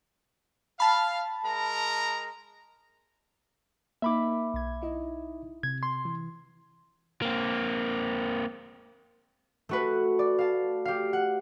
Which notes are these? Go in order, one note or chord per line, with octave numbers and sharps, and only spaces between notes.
F5 A5 B5
G#3 A#4 A#5
A#3 D#4 E5 B5 D6
B1 G#6
D#4 E4 D#5
C3 G#6
C6
E3
A#3 C4
A3 F#4 B4
D5
F5 A5
G4 F5
F#5